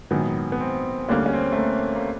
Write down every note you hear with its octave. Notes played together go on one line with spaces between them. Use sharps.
A#1 G#2 D#3 F#3 B3
B3
C4
D2 D3 G3 A#3 C#4
C#4
C4
A3
A#3
A#3